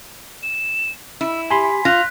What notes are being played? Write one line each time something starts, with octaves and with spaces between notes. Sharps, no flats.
E7
E4 E6
G4 G#5 B5 C6 B6
F4 F#6 A#6